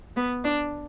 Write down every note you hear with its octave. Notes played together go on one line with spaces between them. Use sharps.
B3
D4